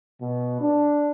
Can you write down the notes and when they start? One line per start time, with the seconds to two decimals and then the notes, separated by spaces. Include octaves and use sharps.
0.21 B2
0.61 D4